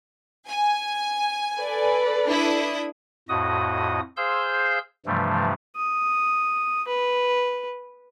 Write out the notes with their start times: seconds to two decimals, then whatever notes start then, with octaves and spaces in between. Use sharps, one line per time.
0.48 G#5
1.57 A4 B4 D5
2.27 D4 E4 D#6
3.29 F2 A2 F#4 D#5 D#6
4.17 G#4 C5 F5 C6 E6 G6
5.06 G2 C3 E3 F3 G3 A3
5.76 D#6
6.88 B4